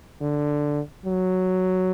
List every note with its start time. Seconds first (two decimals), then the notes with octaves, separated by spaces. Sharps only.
0.22 D3
1.06 F#3